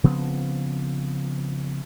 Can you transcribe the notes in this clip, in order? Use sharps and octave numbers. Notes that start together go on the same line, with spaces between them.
C#3 F3 B3 C4